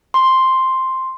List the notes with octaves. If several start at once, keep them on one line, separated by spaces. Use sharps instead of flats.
C6